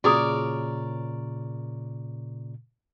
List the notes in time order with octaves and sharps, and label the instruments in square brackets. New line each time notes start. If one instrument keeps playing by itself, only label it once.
[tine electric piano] A#2 C#3 [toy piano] F#4 G#4 D#6 [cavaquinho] A#4 C#5 D5